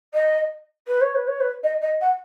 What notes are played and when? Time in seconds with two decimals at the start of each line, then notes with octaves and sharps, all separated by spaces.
0.14 D#5
0.87 B4
1.01 C#5
1.15 B4
1.27 C#5
1.40 B4
1.63 D#5
1.82 D#5
2.01 F#5